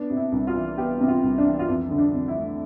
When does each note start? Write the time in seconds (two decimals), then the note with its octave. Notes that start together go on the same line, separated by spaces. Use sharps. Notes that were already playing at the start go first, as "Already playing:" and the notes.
Already playing: B3 D4
0.10 C3
0.17 E4
0.32 C2
0.47 F4
0.55 E3
0.77 B3 G4
1.00 C3
1.08 F4
1.23 C2
1.38 D4
1.45 E3
1.59 F4
1.67 F2 E4
1.91 D3
1.98 D4
2.13 F2
2.28 E4
2.36 A3